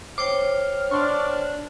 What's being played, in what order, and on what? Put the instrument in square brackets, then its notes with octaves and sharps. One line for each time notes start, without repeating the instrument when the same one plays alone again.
[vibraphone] C5 C#5 G5 [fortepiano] D6 [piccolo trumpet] F6
[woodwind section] D4 [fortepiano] D5 C6 C#6